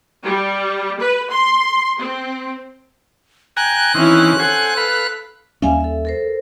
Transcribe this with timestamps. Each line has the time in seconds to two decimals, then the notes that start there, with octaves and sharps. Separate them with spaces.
0.24 G3
1.00 B4
1.31 C6
1.99 C4
3.57 G5 G#5 A#5 F#6
3.95 D#3 E3 C4 C#4 E4
4.39 A4 C5 F#5 G#5
4.77 B4 F5 B5
5.62 D#2 G3 C#4 E5 F5 G#5
5.80 A4 E5
6.05 A4 A#4 C5